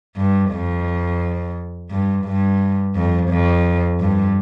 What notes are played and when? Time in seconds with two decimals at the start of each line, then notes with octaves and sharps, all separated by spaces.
0.16 G2
0.51 F2
1.90 G2
2.25 G2
2.95 F2
3.29 F2
3.99 G2